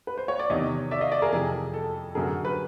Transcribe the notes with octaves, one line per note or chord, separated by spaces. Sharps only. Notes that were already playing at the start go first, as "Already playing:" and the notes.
B4
C5
C#5
D5
E2 C3 D#3 C#5 D#5
D5 E5
D#5 F5
D5 E5
G#4 A#4
F2 C3 E3 G#4
A4
F#2 D3 G#4 A#4
B4